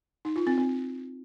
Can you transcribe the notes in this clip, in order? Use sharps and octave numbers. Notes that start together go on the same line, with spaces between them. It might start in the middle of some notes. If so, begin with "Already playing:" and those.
D#4
F4
C4
C4